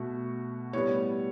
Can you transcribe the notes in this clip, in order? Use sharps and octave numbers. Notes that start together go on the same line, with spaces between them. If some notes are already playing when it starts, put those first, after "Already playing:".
Already playing: B2 A3 F#4
A2 G3 B3 C#5